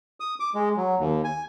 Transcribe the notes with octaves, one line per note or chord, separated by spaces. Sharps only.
D#6
D6
G#3
F#3
D#2
G#5